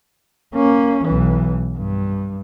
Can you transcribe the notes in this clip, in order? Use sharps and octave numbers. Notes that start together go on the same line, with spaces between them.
A#3 C#4
B1 E3
G2